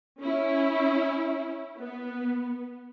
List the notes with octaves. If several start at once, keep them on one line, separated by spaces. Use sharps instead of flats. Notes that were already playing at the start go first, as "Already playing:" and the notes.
C#4 E4
B3